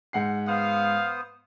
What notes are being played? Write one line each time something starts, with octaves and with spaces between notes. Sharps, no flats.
G#2 F#5 C7
B3 C5 F5 D#6